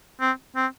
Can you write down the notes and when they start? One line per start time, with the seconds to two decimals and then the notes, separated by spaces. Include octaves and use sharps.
0.20 C4
0.56 C4